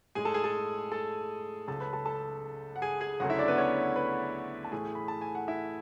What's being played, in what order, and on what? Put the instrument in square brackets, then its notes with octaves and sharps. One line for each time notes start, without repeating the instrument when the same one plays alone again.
[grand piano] A2 G#3 G#4 G#5
A4 A5
G#4 G#5
A4 A5
A4 A5
C#2 C#3 F#3 A4 A5
B4 B5
A4 A5
A4 A5
F#5
G#4 G#5
G#4 G#5
D2 C#3 F#3 A3 F#4 F#5
E4 E5
D4 D5
B3 B4
C#4 C#5
B4 B5
A5
A2 E3 A3 G#4 G#5
B5
A5
G#5
F#5
E4 E5